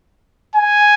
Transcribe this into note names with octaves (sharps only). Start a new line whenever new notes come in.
G#5